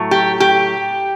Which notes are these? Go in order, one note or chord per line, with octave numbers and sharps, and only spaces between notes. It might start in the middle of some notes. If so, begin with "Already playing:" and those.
Already playing: A2 F#3 A3
G4
G4